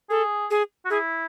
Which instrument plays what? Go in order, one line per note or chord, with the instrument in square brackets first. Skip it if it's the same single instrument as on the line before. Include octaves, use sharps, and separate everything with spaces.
[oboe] G#4 [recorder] A4
[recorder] G#4
[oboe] F#4
[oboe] E4 [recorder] G#4